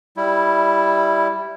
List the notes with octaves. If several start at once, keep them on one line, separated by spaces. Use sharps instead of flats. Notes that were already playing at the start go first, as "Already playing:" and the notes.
G3 E4